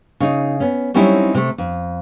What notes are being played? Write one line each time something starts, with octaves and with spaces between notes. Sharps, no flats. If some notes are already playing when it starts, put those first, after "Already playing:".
C#3 D#4
B3 C#4
F#3 G3 C4 C#4 D#4 E4
C3 A3
F2